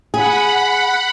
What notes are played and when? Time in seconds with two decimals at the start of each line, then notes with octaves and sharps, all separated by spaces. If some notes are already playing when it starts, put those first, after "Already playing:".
0.14 G#4 F#5 B5